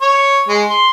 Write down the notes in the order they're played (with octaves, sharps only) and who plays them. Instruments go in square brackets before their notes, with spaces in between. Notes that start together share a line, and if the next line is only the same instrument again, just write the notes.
[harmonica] C#5
G#3
C6